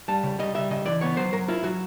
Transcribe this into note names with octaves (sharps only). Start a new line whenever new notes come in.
G3 A5
C#3
G3 D#5
G3 E5
C#3 D#5
E3 D5
B3 C#5
F#3 C5
F#3 A#4
E4 F4
F#3 F#4